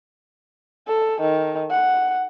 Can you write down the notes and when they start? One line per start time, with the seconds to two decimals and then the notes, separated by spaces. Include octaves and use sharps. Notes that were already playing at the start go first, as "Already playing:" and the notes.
0.88 A4
1.21 D#3
1.70 F#5